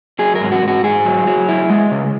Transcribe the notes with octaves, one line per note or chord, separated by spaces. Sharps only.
F#3 G#4
A#4
G#2
F#4
G#2
F#4
G#2 G#4
F#3
F#3
E4
G#3
C#3